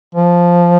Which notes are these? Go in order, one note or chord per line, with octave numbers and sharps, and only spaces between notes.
F3